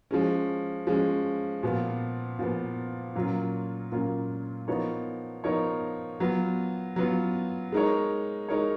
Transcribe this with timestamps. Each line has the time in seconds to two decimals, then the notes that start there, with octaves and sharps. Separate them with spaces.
0.11 F3 G#3 C#4
0.87 F3 G#3 C#4
1.63 A#2 F3 B3
2.39 A#2 F3 B3
3.15 A#2 F#3 A#3 C#4 F4
3.92 A#2 F#3 A#3 C#4 F4
4.68 F3 B3 D#4 A#4 C#5
5.44 F3 B3 D#4 A#4 C#5
6.20 F#3 B3 F4
6.96 F#3 B3 F4
7.72 G#3 D#4 A#4 C#5
8.49 G#3 D#4 A#4 C#5